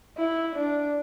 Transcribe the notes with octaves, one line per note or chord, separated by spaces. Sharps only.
E4
D4